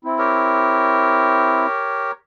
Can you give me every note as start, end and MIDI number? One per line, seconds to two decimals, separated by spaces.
0.05 1.66 60
0.05 1.66 64
0.18 2.11 67
0.18 2.11 70
0.18 2.11 73